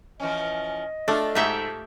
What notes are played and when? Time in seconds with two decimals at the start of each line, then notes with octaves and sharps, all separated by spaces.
0.20 E3 F3 C#4 D#5
1.08 A3 D4 F4 A4
1.35 G#2 A3 G4 E5 G5